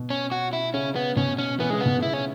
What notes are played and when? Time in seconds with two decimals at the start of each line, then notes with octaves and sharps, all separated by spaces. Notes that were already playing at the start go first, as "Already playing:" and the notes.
Already playing: B2
0.10 C#4
0.32 F#4
0.53 E4
0.74 C#3 C#4
0.96 B3
1.16 B2 C#4
1.38 C#4
1.60 E3 B3
1.70 C#3 G#3
1.80 B2 B3
1.98 C#3 E4
2.13 C#4